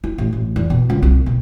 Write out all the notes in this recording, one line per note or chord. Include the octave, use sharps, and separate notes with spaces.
E4
A1
A1
E2
B2
C#2
C2
B2